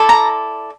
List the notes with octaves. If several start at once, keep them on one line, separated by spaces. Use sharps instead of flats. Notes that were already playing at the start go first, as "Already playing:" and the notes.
Already playing: E4 A4 D5
A#5